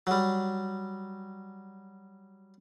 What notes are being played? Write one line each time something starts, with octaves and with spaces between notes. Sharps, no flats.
F#3 G3